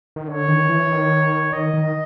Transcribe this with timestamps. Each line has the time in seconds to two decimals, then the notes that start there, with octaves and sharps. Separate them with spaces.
0.16 D#3
0.28 D3 C#5
0.48 D#3
0.69 E3
0.90 D#3
1.53 D#3 D#5
1.74 D#3